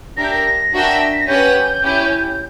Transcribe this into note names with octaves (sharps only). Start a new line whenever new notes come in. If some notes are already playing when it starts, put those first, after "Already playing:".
D4 G4 A#4 E5 A#6
G6
A#6
D4 F#4 A#4 E5 G5
B6
A#6
C#4 G4 B4 F#5 G6
C#4 E4 G4